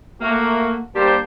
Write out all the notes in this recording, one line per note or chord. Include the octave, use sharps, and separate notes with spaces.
A3 A#3 F#4
G3 A#3 D4 G4 C5